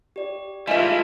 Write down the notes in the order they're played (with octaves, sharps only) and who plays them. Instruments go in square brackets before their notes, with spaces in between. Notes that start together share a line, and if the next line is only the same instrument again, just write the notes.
[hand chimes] G4 D5
[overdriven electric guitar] E3 A3 [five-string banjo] G#3 E5 [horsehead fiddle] F4 F5